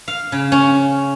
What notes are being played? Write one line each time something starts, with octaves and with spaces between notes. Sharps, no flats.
F5
C#3
C#4